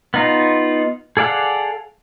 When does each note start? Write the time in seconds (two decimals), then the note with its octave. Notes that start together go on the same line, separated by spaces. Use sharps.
0.14 B3 D#4 F4
1.17 G#4 A4 D5 F5 F#5